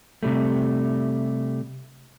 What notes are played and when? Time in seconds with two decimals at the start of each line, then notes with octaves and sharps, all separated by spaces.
0.23 C3 G3 A3